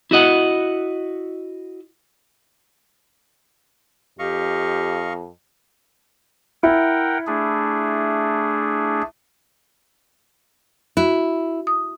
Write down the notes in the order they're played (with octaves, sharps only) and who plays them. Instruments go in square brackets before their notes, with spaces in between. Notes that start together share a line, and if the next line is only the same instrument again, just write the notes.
[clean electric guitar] E4 F#4 D#5 F#5
[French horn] F2 [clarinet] G4 [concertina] D#5 F5 C#6
[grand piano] E4 [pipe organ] A#4 F#5 G5
[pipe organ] A3 D4 G#4
[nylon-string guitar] E4 [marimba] F#4
[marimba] D#6